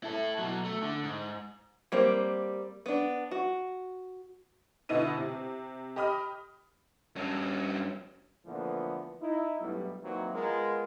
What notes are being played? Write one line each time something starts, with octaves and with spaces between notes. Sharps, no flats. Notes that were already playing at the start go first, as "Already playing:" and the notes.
E4 A4
B2 F#3
A3
D3
G#2
G3 A#3 C4 C5
B3 D4
F#4
B2 D3 B3 E4 D#5 D#7
C3
G4 D#5 B5 D#6 F6
G2 C#4
A#2 D3 E3 F3 A3 B3
D#4 E4
B1 G2 B2 F#3 G3 A3
E3 F#3 A#3 C4 D#4 E4
G#3 B3 F4 A#4